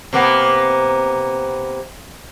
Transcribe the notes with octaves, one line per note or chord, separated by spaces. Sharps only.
C3 A#3 B3